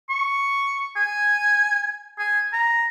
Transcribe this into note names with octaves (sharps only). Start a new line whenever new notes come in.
C#6
G#5
G#5
A#5